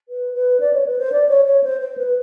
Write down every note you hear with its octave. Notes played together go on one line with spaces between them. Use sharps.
B4
B4
D5
C#5
B4
C5
D5
C#5
C#5
C5
C5
B4